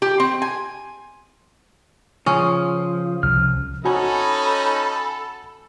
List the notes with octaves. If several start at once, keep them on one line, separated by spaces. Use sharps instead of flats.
G4
C4
G#5
C#3 F3 C#4 D#6
C2 F3 F6
C#4 D#4 F#4 A4 G#5 B5